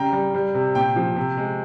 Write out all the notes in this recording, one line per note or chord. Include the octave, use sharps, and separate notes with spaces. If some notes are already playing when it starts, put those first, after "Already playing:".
Already playing: C#3 G3 G5 A#5
G3
G3
C3
A#2 G5
F3
C3
G#3